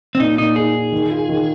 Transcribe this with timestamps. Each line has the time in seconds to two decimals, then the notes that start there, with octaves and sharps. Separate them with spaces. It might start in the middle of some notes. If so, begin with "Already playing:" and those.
0.15 C4
0.20 A#2 D#4
0.38 A#2 D#4
0.56 D#4 G#4
0.75 D#4
0.92 D#3
1.10 F4
1.29 D#3